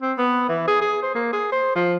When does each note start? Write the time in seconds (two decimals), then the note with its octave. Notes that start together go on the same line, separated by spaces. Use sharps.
0.02 C4
0.18 B3
0.49 E3
0.67 G#4
0.81 G#4
1.02 C5
1.15 A#3
1.33 G#4
1.52 C5
1.75 F3